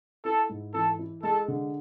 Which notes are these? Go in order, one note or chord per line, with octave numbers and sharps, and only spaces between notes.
E4 A4
G#2
E3 A4
E4
G#3 A4
D3